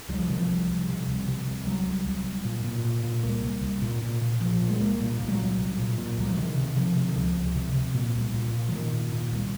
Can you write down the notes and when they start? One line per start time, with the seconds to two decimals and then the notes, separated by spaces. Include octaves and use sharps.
0.09 C2 F#3
0.19 F3
0.28 C3 D#3
0.38 F3
0.49 C2
0.68 C2
0.89 C3
1.08 C2
1.28 C3
1.47 C2
1.66 C2 F#3
1.86 C2
2.06 C2
2.25 C2
2.45 A#2
2.64 A#2
2.85 A#2
3.04 A#2
3.23 C2 A#3
3.43 C2
3.63 C2
3.82 A#2
4.02 A#2
4.22 A#2
4.41 A#2 F3
4.61 A#2
4.70 G#3
4.80 C2 A#3
5.00 A#2
5.19 A#2
5.28 G#3
5.32 F#3
5.40 C2
5.59 C2
5.78 A#2
5.98 A#2
6.17 C2 F#3
6.29 F3
6.37 C3 D#3
6.57 C3
6.76 C3 F3
6.96 C3
7.09 D#3
7.15 C#2 F3
7.36 C#2
7.56 C3
7.75 C3
7.94 A#2
8.14 C2
8.34 A#2
8.53 A#2
8.69 F3
8.72 A#2 D#3
8.92 A#2
9.12 A#2
9.32 C2